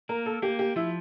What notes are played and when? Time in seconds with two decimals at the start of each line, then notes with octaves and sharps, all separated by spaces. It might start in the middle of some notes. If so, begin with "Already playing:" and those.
0.09 A#3 A#4
0.26 A4
0.42 A#3 G4
0.59 G4
0.76 F3 E4